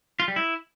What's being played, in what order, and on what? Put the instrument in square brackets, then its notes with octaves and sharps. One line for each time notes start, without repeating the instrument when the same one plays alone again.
[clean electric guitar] F4
G3
E4